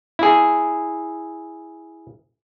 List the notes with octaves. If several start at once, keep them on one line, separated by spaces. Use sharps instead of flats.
E4 G#4